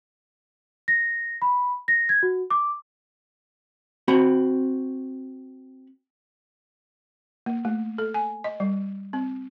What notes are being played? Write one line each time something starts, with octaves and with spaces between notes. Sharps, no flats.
A#6
B5
A#6
G#6
F#4
D6
C4 F#4 B5
A#3
A3
A4
G#5
D#5
G3
C4